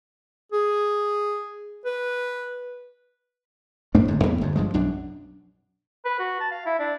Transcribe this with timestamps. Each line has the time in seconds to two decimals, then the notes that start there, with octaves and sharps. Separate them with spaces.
0.52 G#4
1.85 B4
3.95 G2 A3 A#3 D4
4.08 G1 G#2
4.23 E2 G3 A#3 B3
4.41 G1 F2
4.56 G2 F3 G#3
4.74 B1 F#2 D4
6.05 B4
6.19 F#4
6.40 A5
6.52 F5
6.66 E4
6.79 D4